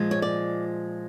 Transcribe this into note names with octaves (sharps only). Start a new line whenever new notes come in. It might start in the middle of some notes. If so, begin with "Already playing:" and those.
Already playing: A#2 F3 G#3
C#5
D5